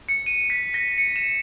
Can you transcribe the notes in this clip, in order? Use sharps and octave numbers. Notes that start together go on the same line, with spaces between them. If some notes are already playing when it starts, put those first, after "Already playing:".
C#7
D#7
B6
A#6
C#7
E7